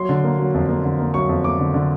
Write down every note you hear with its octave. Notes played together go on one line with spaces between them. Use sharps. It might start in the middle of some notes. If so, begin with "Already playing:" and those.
Already playing: F#3 C6
D3
A#3
F#3
F2
A#3
D3
A#3
F#3 C#6
F2
A#3 D6
D3
D3